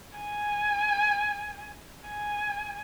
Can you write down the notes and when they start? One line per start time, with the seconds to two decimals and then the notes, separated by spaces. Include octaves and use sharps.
0.18 G#5
2.08 G#5